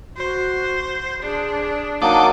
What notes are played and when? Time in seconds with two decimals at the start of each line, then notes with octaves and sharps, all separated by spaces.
0.16 F#4 C5
1.22 D4 G#4
2.02 F#3 A#3 D#4 F#5 A5 D6